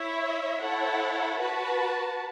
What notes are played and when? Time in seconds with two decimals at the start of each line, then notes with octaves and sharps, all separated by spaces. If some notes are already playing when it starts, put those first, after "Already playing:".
Already playing: E4 C#5 E5
0.58 E4 A4 C#5 F#5
1.38 F#4 B4 A5